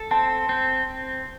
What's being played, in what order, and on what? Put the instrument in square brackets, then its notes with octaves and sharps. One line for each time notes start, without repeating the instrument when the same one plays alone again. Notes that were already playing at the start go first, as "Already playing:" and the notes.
Already playing: [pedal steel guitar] A4
[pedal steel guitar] C4 [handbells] A5
[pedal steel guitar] C4